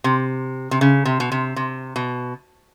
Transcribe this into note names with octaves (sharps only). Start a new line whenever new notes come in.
C3
C3
C#3
C3
B2
C3
C3
B2